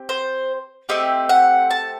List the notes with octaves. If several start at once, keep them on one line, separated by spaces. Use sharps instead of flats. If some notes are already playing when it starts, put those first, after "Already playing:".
Already playing: C4 G4
C5
A3 C4 G4 D#5
F#5
A5